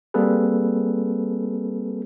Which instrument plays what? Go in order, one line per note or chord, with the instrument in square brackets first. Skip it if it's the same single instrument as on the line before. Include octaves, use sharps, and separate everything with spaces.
[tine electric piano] G3 A#3 C4 G#4 A4 B4